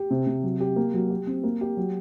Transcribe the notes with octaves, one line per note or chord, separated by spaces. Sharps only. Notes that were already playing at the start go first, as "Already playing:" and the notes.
Already playing: G4
C3
C3
F#3
G4
A#3
F#3
G4
C4
A#3
G4
F#3